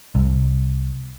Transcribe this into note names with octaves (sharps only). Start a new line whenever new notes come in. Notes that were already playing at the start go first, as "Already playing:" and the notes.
C2